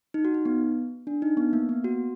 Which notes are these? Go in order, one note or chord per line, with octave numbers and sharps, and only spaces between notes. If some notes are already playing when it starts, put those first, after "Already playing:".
D#4
F#4
D#4
B3
D4
D#4
B3
A#3
B3
F#4